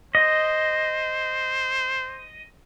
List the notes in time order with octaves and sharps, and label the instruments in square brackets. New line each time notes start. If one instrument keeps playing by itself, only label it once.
[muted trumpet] C5 [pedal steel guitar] D#5